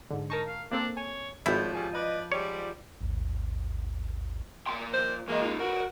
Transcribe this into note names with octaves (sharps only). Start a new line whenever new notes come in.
G#2 D3
D#4 A#4 A5 C#6
F5
A#3 C4 D4 A4
C#5 G#5
G#1 A2 F3 G3 E4
A2 G3 G#4
B4 D5 D#5
G#2 G3 C#5 D5
A1 D#2 G#2
A#2 C6
D#3 F3 C5
E3 G#3 A#3 D#5
D#4 F4
F#4 A#4 B4